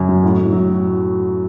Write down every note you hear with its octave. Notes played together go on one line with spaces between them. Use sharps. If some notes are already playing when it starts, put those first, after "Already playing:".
Already playing: F#2
F#3
A2
A2
F#3